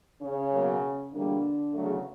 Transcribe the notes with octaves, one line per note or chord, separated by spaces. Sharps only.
C#3 C#4
B2 F#3 A#3
E2 B2 D3 G3 A#3 D4
E2 C#3 F#3 A3